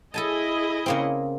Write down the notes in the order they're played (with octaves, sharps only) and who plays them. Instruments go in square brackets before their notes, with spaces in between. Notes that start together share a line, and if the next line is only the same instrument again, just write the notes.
[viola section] E4 G#4 D#5 [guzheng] A4 G#5 A5
[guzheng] C#3 A#3 C4